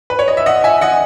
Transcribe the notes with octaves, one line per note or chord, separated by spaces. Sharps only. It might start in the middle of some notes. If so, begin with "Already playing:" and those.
B4
C#5
D#5
E5
D#5 F#5
E5 G#5
D#5 F#5